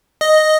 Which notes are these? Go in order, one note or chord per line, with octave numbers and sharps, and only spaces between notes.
D#5